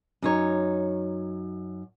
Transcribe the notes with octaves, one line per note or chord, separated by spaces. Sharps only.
F#2 D#4 C#5